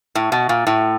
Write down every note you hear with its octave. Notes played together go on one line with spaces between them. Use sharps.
A2
B2
A#2
A2